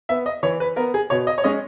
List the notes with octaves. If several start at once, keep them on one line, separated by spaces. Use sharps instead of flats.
B3 E5
D#5
E3 C#5
B4
B3 A#4
G#4
B2 C#5
D#5
C#5
G#3 C#4 D#5